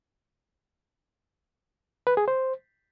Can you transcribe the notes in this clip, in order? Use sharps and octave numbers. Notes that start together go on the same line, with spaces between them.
B4
G#4
C5